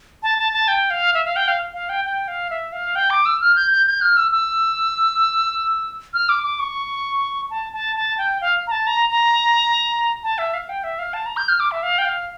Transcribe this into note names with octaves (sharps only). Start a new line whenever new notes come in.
A5
A5
A5
G5
F5
E5
F5
G5
F5
F5
G5
G5
F5
E5
F5
G5
D6
E6
F6
G6
G6
G6
F6
E6
E6
F6
D6
D6
C#6
A5
A5
A5
G5
F5
A#5
A5
A#5
A#5
A5
E5
F5
G5
E5
F5
A5
A#5
G6
F6
D6
E5
F5
G5
F5